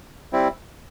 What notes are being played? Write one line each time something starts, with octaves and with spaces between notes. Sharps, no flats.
G3 C4 E4